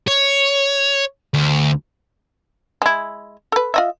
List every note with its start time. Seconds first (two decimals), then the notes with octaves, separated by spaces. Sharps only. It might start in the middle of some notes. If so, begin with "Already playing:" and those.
0.07 C#5
1.34 D2
2.82 G#3 E4
3.52 A4 B4
3.74 F4 D#5 E5